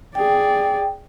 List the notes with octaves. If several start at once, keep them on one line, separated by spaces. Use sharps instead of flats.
G#4 D5 G5